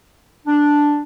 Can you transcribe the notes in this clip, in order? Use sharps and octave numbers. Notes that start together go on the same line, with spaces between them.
D4